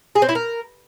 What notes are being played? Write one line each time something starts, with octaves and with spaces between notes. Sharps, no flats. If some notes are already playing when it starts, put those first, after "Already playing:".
G#4
C4
E4
A#4